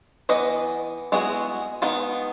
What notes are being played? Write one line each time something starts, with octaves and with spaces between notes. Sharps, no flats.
E3 B3 B4 D#5
G#3 B3 E4 F#4 G#4
D#3 G#3 B3 D#4 B4